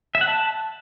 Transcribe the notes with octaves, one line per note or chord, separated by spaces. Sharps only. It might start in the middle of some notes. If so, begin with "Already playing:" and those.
E5
F#5
A5